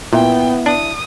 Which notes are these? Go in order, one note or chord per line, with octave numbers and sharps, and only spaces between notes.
A#2 B3 E4 E5 G5
D4 D#6